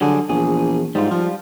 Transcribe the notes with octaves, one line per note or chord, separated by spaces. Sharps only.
D3 F#3 G3 G#4
A#1 E2 G#4
G#2 G3 F4
F3